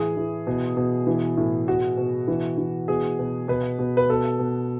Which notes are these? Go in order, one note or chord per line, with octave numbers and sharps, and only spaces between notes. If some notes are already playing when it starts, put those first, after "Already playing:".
Already playing: A2 E3 G#4
E3
B2
B2
E3
A2
B2 F#4
B2
E3
E3
B2 G#4
B2
B2 B4
B2
B4
B2 A4
B2